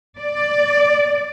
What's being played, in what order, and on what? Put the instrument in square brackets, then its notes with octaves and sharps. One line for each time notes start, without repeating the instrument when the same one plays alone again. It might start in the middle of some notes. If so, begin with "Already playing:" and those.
[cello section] D5